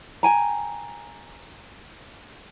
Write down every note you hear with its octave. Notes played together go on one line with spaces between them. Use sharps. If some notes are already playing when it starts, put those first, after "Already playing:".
G5 G#5 A#5